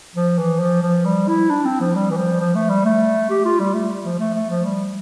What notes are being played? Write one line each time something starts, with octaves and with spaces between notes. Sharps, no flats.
F3
E3
F3
F3
G3
E4
D4
C4
F3
G3
E3
F3
F3
A3
G3
A3
G4
F4
G3
A3
F3
A3
A3
F3
G3